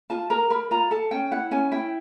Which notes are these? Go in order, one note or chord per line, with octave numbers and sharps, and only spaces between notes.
F4 A5
A#4 A#5
A#4 B5
F4 A#5
A4 A5
C#4 G5
E4 F#5
C#4 G#5
E4 G5